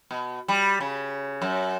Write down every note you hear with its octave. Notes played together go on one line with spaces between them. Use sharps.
B2
G3
C#3
F#2